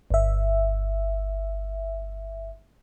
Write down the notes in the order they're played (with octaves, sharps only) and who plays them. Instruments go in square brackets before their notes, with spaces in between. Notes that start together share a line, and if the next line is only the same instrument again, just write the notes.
[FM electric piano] G1 E5